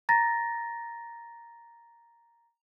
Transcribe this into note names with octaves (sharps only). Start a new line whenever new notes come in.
A#5 A6 A#6